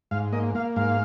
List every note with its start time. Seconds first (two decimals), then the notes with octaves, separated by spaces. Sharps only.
0.11 G#2 F5
0.33 A#3 D#5
0.55 A#3 F5
0.76 G#2 F5